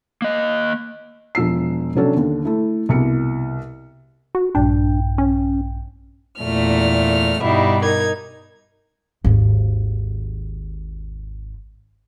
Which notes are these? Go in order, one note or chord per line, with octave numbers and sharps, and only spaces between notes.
A#3 D#5
E1 F3 E6 C7
C3 F#3 C#4 D4 A4
D#2 D3
A3 E4
C2 B2 E4 C#7
F#4
A#1 G2 D4 G5
C#4
E2 A#2 A3 F6
G2 B2 G3 D#4 E4
D#4 A#4 G#6
G#1 D#2